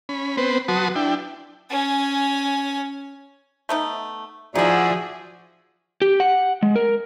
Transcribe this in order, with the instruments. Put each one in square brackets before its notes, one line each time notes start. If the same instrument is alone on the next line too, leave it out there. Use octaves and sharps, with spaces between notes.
[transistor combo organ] C#4 B5
B3 C4 B4 C5
F#3 F#4 B4 A5 C6 D#6
D4 E4 G5
[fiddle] C#4 G#5
[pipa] A3 B3 D#4
[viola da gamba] F3 [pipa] D#4 E4 [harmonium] F#4 D5 E5 [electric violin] G#4
[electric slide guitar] G4
F#5
G#3
A#4